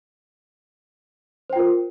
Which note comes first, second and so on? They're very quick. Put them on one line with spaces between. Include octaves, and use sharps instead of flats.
C5 G5 F4 A#4